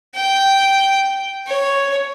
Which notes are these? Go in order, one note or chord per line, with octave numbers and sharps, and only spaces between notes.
G5
C#5